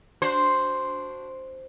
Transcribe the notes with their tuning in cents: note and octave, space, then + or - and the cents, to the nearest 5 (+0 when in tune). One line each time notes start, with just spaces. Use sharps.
D4 -10 F#4 +0 C5 +0